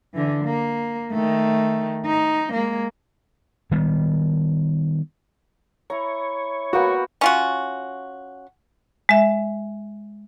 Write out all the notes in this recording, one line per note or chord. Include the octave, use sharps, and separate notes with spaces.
D3 E3
A#3
D#3 A3
D#4
G#3 A#3
D#3 G3 B3
E4 C#5 A#5
A#3 B3 F#4 G5
C#4 F4 F#4
G#3 E5